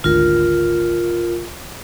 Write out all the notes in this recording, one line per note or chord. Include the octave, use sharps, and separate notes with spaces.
G#1 D2 F4 A#4